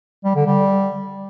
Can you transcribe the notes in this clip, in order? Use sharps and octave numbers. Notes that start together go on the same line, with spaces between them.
G3
D3
G3